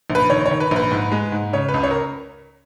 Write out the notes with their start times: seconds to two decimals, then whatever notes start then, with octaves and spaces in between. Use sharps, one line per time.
0.10 A#1
0.15 B4
0.30 D#3 C#5
0.46 C#5
0.51 D#3
0.60 B4
0.71 A#1 B4
0.91 G#2
1.12 G#3
1.32 G#2
1.53 C#3 C#5
1.69 B4
1.74 C#2
1.83 C#5
1.91 A#4